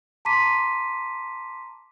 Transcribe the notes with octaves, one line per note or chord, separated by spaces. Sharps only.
A5 A#5 C6 D6 B6 D#7